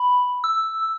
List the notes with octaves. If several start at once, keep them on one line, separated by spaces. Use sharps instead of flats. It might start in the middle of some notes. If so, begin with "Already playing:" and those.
Already playing: B5
E6